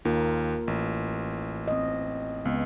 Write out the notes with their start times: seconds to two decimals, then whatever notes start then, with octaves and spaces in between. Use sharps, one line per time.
0.05 D#2 A#3 F4 A#4
0.67 A1
1.68 C4 D#5
2.45 C#2 B3